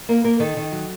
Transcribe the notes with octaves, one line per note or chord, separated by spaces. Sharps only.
A#3 A#4
A#3 A#4
D#3 A4
D#3
F#3